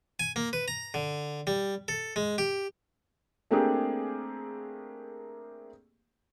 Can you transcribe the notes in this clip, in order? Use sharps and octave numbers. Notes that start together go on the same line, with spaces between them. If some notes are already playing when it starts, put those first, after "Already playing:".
G#5
A#3
B4
A#5
D3
G3
A4
G#3
G4
A3 A#3 C4 D4 G4 G#4